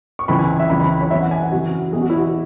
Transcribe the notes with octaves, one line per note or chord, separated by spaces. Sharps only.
C#6
C#2 C#3 E3 B5
G#5
E5
C#2 C#3 E3 B5
B5
C#5
F#2 E3 E5
F#5
G#5
F#5
F#2 C#3 E3 F#4
E2 B2 G#4
F#4
E4
F#4